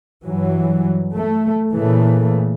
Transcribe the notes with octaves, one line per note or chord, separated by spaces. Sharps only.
G2 E3 F#3
A3
A#2 C#3 E3 A3